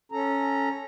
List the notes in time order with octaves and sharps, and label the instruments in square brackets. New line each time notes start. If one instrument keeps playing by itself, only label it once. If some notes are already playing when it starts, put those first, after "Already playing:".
[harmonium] C#4 A4 A#5